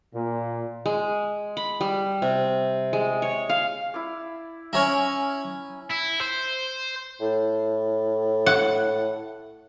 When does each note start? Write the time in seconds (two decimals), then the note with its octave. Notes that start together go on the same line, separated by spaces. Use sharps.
0.14 A#2
0.86 G#3
1.57 B5
1.81 G3
2.22 C3
2.93 G#3
3.22 C#5
3.49 F5
3.94 E4 D5
4.73 C#4 E4 C#5 G#5 A#5
5.91 E4
6.21 C5
7.21 A2
8.46 F#5